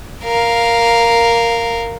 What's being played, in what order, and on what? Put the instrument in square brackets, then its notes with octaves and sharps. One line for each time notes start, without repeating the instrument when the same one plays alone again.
[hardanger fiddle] A#4 F5